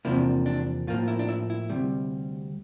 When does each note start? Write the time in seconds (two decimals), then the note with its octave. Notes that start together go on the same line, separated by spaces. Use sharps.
0.05 E2 C3 F3 A#3 D4 E4
0.46 D4
0.87 A2 F3 A#3 F4
1.08 E4
1.19 D4
1.29 E4
1.50 E4
1.70 D2 C3 G3